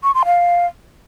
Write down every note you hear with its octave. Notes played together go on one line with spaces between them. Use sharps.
C#6
C6
F5